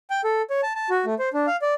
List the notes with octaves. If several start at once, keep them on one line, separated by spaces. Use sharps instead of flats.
G5
A4
C#5
A5
A5
F#4
A3
C5
D4
F5
D5